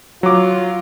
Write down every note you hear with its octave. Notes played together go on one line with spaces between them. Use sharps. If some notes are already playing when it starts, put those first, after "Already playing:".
F#3 F4 D6